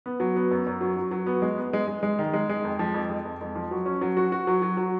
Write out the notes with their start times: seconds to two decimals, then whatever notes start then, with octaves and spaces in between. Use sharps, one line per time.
0.06 B3
0.20 F#3
0.36 B3
0.51 F#2
0.66 F#2
0.81 F#3
0.96 F#3
1.11 F#3
1.26 B3
1.42 G#3
1.58 B3
1.73 G#3
1.87 G#3
2.03 G#3
2.19 D#3
2.33 G#3
2.49 G#3
2.65 F2
2.79 F3
2.94 F2
3.10 G#3
3.25 F2
3.41 F2
3.55 F3
3.71 F#3
3.86 C#4
4.01 F#3
4.17 F#4
4.32 F#4
4.47 F#3
4.62 F#3
4.77 F#3